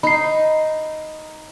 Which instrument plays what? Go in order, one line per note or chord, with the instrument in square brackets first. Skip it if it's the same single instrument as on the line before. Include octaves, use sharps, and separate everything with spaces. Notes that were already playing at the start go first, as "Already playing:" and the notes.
[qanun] D#4 [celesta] B5 C7